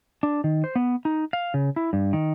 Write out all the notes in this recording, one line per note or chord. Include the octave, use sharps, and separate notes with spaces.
D4
D#3
C5
B3
D#4
F5
C#3
E4
G2
D#3